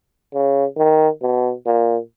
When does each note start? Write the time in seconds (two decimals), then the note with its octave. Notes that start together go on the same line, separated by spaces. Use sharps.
0.34 C#3
0.77 D#3
1.22 B2
1.66 A#2